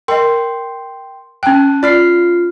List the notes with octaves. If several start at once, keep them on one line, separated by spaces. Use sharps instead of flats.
A#4 D#5 G5 C6
C#4 G5 A5 F#6
F4 D5 F6 C7